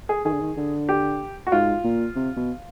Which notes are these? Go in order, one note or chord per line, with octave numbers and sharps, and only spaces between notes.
G#4
D#3 G#4
D3
D#3
D3
G4
F#4
G#2 F4
A#2
C3
B2